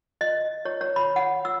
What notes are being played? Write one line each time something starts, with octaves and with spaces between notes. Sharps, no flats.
D#5
C#5
C#5
B5
F#5
E6